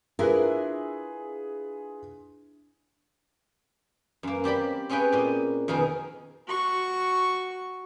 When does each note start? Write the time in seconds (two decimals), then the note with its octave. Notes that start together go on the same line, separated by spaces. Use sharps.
0.19 D4 E4 F4 G#4 A#4 B4
4.23 F#2 A#3
4.44 C4 G4 D5 B5
4.89 C4 C#4 G#4 B4 G5
5.13 A#2 D#5
5.68 F2 B2 D#3 G#4 A#4
6.47 F#4 C#6